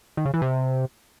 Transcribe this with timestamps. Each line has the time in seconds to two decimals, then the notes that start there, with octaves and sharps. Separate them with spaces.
0.17 D#3
0.26 C#3
0.34 E3
0.42 C3